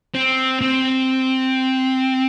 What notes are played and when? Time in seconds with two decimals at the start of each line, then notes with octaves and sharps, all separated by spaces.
0.15 C4
0.61 C4